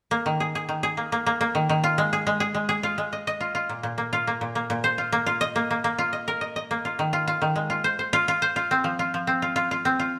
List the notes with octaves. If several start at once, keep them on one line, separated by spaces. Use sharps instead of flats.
A#3
D#3
G#4
G#4
D#3
G#4
A#3
A#3
A#3
A#3
D#3
D#3
F4
G#3
G#4
G#3
G#4
G#3
G#4
F4
G#3
D#5
D#5
F4
F4
A#2
A#2
A#3
F4
A#3
A#2
A#3
A#2
C5
F4
A#3
F4
D#5
A#3
A#3
A#3
F4
D#5
A#4
D#5
D#5
A#3
F4
D#3
F4
F4
D#3
G#3
F4
C5
C5
F4
F4
C5
F4
C4
F3
F4
F3
C4
F4
F4
F4
C4
F4